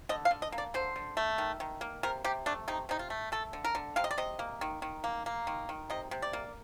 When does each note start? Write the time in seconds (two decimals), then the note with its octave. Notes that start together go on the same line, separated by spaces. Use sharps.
0.09 D3 D#5
0.25 F5
0.31 D3
0.42 D#5
0.52 A#3
0.58 D5
0.74 D3 C5
0.96 D3
1.17 A3
1.38 D#3
1.60 D#3
1.81 A#3
2.03 C3 A#4
2.24 C3 G4
2.46 A3 D4
2.68 C3 D#4
2.89 C3 D#4
2.99 F4
3.10 A3
3.32 A3 A4
3.53 D3
3.64 A#4
3.75 D3
3.96 C3 F5
4.04 D#5
4.11 D5
4.18 C3 D#5
4.39 A#3
4.61 D#3
4.82 D#3
5.04 A#3
5.26 A#3
5.47 D#3
5.69 D#3
5.90 C3 D#5
6.11 C3
6.22 D5
6.33 A#3